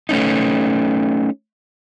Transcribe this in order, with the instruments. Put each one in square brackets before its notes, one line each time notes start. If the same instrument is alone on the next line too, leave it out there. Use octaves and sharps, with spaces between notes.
[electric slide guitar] A3 C#4 D#4